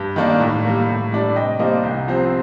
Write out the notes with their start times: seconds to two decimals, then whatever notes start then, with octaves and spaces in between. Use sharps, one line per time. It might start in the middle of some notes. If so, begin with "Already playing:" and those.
Already playing: G2
0.16 D#3 A#3 D4
0.40 A2
0.65 G3 A#3
0.89 A2
1.12 G3 D4
1.35 C3 D#5 G5
1.59 G3 A#3 D4 C5 D#5
1.83 C2
2.08 C3 F3 C4